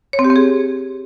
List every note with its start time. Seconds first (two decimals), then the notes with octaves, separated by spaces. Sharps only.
0.13 C#5
0.19 C4
0.24 G4
0.30 C4
0.36 G#4